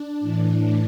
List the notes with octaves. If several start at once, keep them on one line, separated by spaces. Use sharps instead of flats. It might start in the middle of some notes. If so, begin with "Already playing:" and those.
Already playing: D4
A2 E3